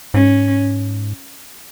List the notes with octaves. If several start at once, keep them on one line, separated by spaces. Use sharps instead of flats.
G#2 C#4